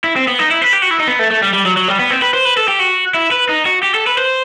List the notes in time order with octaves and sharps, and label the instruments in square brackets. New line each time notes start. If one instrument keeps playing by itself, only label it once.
[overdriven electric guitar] E4
C4
B3
D#4
E4
B4
G4
F#4
E4
D#4
B3
A3
A3
G3
G3
F#3
F#3
G3
B3
C4
B4
C5
B4
A4
G4
F#4
E4
B4
D#4
F#4
G4
A4
B4
C5